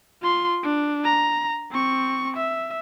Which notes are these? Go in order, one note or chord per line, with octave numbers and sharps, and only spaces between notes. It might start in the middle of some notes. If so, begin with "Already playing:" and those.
F4 C6
D4
A#5
C4 C#6
E5